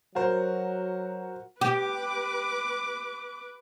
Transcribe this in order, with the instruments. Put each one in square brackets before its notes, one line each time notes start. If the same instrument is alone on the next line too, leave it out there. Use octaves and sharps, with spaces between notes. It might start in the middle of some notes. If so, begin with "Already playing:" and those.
[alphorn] F#3 [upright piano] F#4 A#4 C5
[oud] G4 [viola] B4 D6